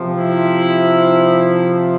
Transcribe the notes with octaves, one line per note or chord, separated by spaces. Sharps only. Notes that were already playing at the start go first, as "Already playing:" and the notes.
Already playing: C3 F3
E4